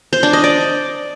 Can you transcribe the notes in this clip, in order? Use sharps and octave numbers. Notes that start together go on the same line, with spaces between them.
C5
D4
D#5
D5